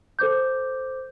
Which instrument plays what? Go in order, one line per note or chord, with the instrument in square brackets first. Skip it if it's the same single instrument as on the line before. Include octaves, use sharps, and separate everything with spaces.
[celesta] A4 C5 D6 G6